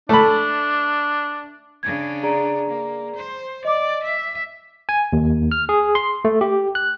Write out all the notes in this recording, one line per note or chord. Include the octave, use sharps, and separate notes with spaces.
A3 D4 B5
C#3 D4 G#6
G#4 D5 A#5
A#3
C5
D5 D#5 D6
E5
G#5
D#2
F6
G#4
C6
A3
G4
F#6